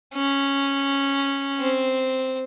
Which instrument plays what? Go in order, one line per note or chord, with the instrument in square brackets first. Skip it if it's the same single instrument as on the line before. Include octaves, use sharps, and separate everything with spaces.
[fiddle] C#4
C4